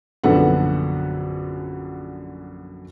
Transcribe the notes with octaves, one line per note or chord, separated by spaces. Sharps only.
A#1 F#2 D3 B3 A4 F#5